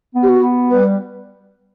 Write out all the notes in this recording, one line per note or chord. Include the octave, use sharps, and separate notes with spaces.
B3
G4
F#4
B3
G3 B4